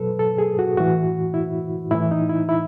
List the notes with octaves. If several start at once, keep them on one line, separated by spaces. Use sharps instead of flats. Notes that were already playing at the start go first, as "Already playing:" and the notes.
Already playing: B2 F#3 A4 B4
A4
G#4
F#4
A2 E3 F#4
E4
A2 E3 E4
D#4
E4
E4